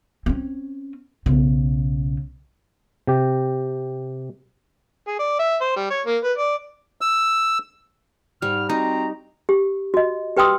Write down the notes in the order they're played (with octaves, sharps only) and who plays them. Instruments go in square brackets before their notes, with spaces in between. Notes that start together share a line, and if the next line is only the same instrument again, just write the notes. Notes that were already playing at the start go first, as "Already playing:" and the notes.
[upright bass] C4 C#4
B1 C#3
[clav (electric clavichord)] C3 G4
[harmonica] G#4
D5
E5
C5
G3
C#5
A#3
B4
D5
[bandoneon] E6
[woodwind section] G#2 F6 [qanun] G3
[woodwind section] C4 F#4 A#5 [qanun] D#4
[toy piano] G4
F#4 D#5
G4 B4 G5 C6 D#6 E6